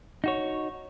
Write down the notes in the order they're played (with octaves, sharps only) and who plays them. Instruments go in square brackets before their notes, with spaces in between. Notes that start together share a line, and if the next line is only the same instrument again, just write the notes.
[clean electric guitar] D#4 F#4 C#5